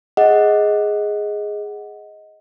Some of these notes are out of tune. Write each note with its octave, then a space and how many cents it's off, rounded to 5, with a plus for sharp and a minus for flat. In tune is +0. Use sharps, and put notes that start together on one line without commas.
G#4 +0 D#5 +15 F#5 +0